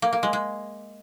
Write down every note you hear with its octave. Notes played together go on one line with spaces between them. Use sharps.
A#3
A#3
G#3
G#3